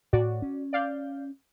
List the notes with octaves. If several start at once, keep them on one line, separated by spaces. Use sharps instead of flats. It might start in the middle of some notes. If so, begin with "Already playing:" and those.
A2 F#4 D5
C#4
D5 F5 G6